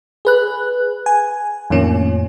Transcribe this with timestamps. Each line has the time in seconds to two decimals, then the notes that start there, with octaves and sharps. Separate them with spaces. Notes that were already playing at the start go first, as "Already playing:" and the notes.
0.25 G#4 B4 F#6
1.06 G#5
1.70 F2 A2 D#3 F3 A#3 C#4